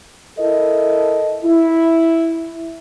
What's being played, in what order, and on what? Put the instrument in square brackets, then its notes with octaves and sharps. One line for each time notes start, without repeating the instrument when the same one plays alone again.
[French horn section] E4 A4 A#4 D#5
E4